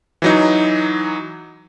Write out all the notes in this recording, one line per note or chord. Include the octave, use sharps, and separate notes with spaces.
E3 F#3 D#4